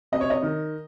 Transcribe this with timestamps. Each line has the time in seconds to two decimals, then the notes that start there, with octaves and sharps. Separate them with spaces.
0.12 C3 D#5
0.21 C#5
0.30 D#5
0.43 D#3